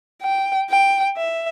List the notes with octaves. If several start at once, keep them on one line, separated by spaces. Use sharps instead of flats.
G5
G5
E5